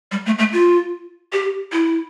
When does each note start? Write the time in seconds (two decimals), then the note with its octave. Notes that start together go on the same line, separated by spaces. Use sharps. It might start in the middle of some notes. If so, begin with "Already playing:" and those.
0.12 G3
0.26 A3
0.39 A3
0.53 F4
1.32 G4
1.72 E4